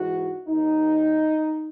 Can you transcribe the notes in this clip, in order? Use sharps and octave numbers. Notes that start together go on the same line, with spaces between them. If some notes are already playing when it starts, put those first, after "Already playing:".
Already playing: G#2 E3 F#4
D#2 D#3 D#4